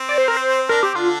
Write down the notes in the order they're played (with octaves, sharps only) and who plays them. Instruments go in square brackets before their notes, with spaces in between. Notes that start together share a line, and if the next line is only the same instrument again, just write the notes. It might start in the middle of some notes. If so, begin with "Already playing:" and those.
Already playing: [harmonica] C4
[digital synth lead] D5
C5
A#4
C5
[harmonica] D4 [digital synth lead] A#4
[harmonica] C4 [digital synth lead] G4
[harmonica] D3 D4 [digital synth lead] F4